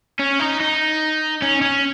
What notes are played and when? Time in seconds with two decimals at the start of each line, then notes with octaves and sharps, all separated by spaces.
0.19 C#4
0.39 D#4
0.60 D#4
1.42 C#4
1.61 C#4